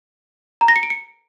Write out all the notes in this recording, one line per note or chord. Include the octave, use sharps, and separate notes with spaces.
A#5
A#6
C#7
D7
C#7